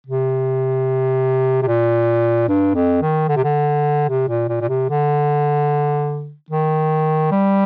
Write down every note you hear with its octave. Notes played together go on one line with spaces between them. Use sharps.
C3
C3
A#2
G2
F2
D#3
D3
C3
D3
C3
A#2
A#2
A#2
C3
D3
D#3
G3